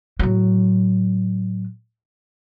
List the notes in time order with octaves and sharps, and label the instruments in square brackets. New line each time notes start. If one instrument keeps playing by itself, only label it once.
[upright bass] A2 F#3